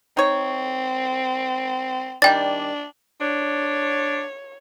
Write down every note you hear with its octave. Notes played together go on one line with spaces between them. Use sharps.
C4 D#4 C#5
D#3 G3 D4 D5 G5 A6
D4 C#5